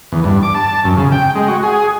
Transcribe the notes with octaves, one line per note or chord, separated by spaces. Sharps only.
E2
G2
D6
A5
F#2
C#3
G5
G#3
F#4
G#4